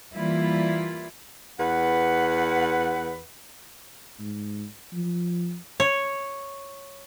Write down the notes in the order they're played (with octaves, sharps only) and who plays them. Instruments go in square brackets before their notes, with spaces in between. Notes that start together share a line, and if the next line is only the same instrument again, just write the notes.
[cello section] E3 G3 A#3 E4 F4
[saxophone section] E2 B4 F#5
[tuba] G#2
F3
[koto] C#5